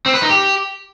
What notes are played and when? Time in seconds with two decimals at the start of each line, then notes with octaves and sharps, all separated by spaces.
0.06 C4
0.14 B4
0.22 D#4
0.30 G4